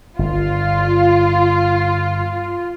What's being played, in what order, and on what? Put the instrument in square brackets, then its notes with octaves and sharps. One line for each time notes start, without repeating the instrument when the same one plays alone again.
[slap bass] G1 [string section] F4